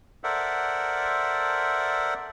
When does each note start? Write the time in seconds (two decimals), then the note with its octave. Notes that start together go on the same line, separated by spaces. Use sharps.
0.24 A4 A#4 C5 D5 E5 F#5